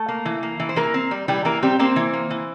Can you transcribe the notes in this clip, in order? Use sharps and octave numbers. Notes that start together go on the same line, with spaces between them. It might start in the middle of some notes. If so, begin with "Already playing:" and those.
Already playing: A3 A4
A#3
E3
A#3
E3
C5
E3 A#3 A#4
C4
G3
E3 G3 G4
E3 A#3 A#4
G3 C4 G4
A#3 C4 C5
E3
A#3
E3